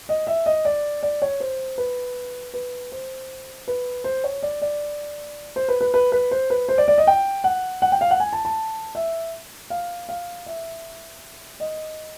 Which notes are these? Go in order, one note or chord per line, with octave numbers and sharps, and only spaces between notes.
D#5
E5
D#5
D5
D5
C#5
C5
B4
B4
C5
B4
C5
C#5
D5
D5
C5
B4
B4
B4
B4
C5
B4
C5
D5
D5
D#5
G5
F#5
F#5
G5
F5
F#5
G#5
A5
A5
E5
F5
F5
E5
D#5